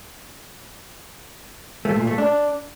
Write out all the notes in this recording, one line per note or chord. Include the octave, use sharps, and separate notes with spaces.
A3
A#2
A3
D4